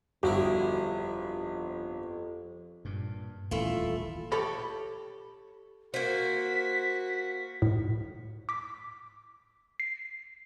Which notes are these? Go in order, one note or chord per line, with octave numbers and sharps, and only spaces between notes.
G1 F2 G3 E4 F#4 G#4
G2 A#2
D#1 A1 A3 E4 F4
G4 A4 C#5 B5
A#3 F#4 C5 B6
A2
D6 B6
C7